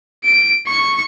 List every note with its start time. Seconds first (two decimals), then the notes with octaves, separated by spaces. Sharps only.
0.24 D7
0.67 C#6